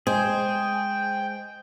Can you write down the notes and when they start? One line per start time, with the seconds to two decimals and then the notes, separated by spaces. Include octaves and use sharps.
0.07 G#3 G#4 C5 D#5 G5 G#5